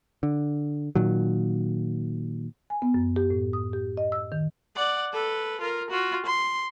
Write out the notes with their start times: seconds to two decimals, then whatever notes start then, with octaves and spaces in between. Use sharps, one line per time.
0.23 D3
0.95 A#2 D#3 F#3
2.70 G#5
2.82 B3
2.94 F#2
3.16 G4
3.30 A2
3.53 D#6
3.73 G4
3.97 D#5
4.12 E6
4.32 D#3
4.76 D5 F#5
5.13 A4 B4
5.60 F4 A#4
5.90 F4 F#4
6.26 C6